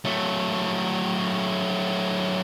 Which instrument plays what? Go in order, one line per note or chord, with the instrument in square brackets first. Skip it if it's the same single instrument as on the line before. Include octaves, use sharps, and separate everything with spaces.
[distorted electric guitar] F#3 A3